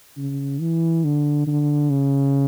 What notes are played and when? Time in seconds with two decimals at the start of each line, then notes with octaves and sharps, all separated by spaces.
0.17 C#3
0.61 E3
1.04 D3
1.47 D3
1.90 C#3